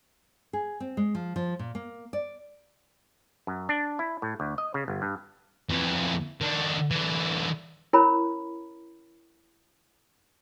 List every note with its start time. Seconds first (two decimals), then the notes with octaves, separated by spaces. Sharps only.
0.53 G#4
0.80 C4
0.97 G#3
1.15 F3
1.36 F3
1.59 A#2
1.75 A#3
2.13 D5
3.47 F#2
3.69 D4
3.99 E4
4.22 A2
4.40 D2
4.58 D#5
4.74 C#3
4.88 G1
5.02 G2
5.70 F2 E3
6.41 D#3 D4
6.91 D3 E3
7.93 C#4 E4 A#4 C#5 A#5 B5